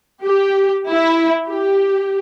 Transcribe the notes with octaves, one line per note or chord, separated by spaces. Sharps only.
G4
E4
G4